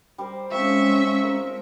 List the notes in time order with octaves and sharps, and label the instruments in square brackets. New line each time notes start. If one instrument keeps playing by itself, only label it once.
[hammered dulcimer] G3 A#4 C5
[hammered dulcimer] F3 C4 D#4 [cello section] G#3 C#4 [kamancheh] E5 C#6
[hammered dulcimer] A#4